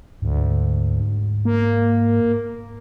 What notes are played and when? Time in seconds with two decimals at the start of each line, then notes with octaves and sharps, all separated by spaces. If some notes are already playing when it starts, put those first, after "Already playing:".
0.22 D2 G#2
1.45 A#3